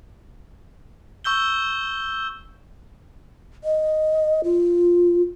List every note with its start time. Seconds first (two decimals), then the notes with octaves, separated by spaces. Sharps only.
1.24 C#6 E6 G6 G7
3.64 D#5
4.44 F4